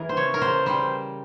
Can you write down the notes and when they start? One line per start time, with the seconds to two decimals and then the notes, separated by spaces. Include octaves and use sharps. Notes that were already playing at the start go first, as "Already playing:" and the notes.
Already playing: E3 G#4 A#4
0.09 C5
0.17 C#3 C#5
0.34 A#4
0.41 C#3 C5
0.66 G3 C5